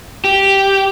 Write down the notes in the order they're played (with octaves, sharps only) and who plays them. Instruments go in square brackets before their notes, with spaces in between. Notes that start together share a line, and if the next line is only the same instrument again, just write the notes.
[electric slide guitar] G4